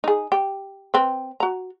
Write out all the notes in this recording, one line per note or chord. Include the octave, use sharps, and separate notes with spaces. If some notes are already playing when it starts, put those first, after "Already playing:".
D#4 G#4
G4
C4 B4
F#4 A#5